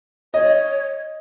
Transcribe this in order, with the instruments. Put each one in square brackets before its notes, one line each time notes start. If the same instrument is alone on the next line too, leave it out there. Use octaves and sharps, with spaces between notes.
[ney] C#5 [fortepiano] D#5